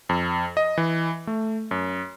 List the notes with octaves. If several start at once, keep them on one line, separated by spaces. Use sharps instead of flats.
F2
D#5
E3
A3
F#2